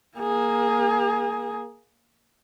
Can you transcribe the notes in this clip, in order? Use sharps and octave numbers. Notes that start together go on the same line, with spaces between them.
A#3 G#4